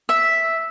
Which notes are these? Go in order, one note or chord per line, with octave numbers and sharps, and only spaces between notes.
E5